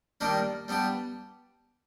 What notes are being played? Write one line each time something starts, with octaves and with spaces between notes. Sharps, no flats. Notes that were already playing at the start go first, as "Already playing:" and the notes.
D#3 G3 A#3 D4 G4
G3 B3 D4 G4